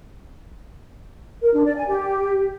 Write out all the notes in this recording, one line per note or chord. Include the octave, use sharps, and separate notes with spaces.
A#4
D4
D5
G#5
G4